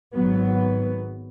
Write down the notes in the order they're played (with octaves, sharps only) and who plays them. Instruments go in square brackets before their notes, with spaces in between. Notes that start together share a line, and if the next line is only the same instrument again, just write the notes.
[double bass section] G#1 G#2 F#3 B3